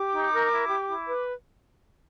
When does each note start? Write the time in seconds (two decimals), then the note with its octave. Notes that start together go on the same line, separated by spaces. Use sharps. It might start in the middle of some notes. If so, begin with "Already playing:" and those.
Already playing: G4 D6
0.12 D#4
0.32 A#4
0.50 E4
0.69 G4
0.88 E4
1.07 B4